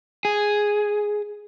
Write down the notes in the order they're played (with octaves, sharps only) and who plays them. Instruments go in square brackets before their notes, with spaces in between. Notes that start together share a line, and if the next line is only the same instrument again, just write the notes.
[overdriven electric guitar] G#4